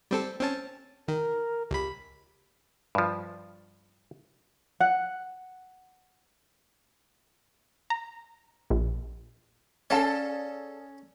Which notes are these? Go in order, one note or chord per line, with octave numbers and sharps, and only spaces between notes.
G3 C4 A4
C4 C#4 A5
D#3 A#4
C#2 G4 B5
G2 F3
F#5
A#5
A#1
C#4 G#4 A4 D5 F5 A5